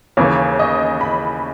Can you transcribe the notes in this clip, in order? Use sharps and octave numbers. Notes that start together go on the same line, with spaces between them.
D#2 C#3 E3 C#5
D#5
B5